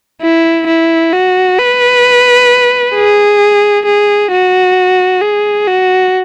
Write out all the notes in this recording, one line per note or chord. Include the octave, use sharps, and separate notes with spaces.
E4
E4
F#4
B4
G#4
G#4
F#4
G#4
F#4